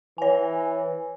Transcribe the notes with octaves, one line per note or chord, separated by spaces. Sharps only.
E3 C#5 G#5